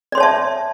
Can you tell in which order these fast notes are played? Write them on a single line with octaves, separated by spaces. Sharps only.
D5 C6 C#5 A5 E5